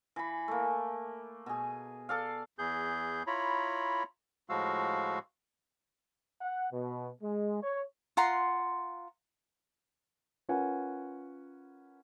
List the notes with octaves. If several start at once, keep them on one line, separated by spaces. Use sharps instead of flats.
E3 B5
A3 A#3
B2 G#4
A4 D5 F5
E2 G#4 G6
E4 F4 C#5 A#5 B5
A2 F3 G#3 F#4 F5 E6
F#5
B2
G#3
C#5
F4 F#5 A#5 C6
C#4 F4 A#4 B4 F#5 G#5